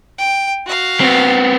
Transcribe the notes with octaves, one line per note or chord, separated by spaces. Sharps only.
G5
F#4 F5
B3 C4